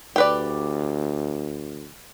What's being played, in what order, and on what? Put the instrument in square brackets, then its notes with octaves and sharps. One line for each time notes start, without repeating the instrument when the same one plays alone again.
[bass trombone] D2 [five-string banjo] G4 B4 D5